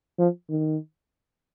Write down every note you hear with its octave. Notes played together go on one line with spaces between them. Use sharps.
F3
D#3